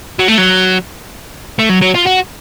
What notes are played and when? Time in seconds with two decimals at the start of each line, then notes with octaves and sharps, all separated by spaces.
0.19 F#3
0.28 A3
0.38 F#3
1.59 A3
1.69 F#3
1.81 F#3
1.94 F4
2.06 F#4